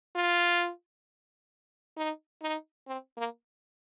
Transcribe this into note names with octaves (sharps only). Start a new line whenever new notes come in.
F4
D#4
D#4
C4
A#3